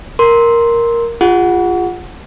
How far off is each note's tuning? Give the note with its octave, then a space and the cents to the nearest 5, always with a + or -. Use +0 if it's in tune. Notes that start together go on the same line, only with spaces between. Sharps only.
A#4 +0 C6 +0
F4 +0 G#4 -40 F#5 -5